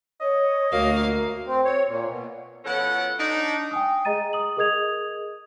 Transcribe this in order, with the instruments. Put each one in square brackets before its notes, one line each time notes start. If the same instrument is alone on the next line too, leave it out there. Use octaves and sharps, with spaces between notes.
[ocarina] C#5 [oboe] D#5
[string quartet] D2 A#3 F5 [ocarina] F#4 [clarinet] A#4
[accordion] C4
C#5
A#2
B2
[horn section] B2 F3 C#4 A4 F#5
D4 D#4
[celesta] G5 G#5 D#6
G#4 D#5 A#5 A6 D#7
D#6 F#7
G#4 A#4 D#5 D#6 G#6 F7